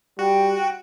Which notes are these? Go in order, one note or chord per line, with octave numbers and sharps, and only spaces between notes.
G3 F#4 G5